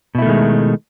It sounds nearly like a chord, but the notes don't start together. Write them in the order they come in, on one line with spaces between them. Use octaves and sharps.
B2 E4 A3 D#3 G#3